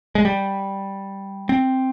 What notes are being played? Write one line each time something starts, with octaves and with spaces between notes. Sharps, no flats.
G#3
G3
C4